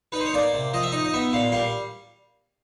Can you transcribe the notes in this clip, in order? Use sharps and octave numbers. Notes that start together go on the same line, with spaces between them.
D#4 B4
C5
C#5
A#3 D5
C3
F3 D#5
E5
D#4 D#5
D#5
B3 E5
A#2 F5
G3 F5